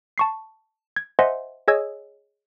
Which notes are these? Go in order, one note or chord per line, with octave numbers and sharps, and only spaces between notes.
A5 C#6 C7
G#6
C5 D#5 E5 F#5 G#5 C6
G#4 C#5 D#5 G#5 E6 G#6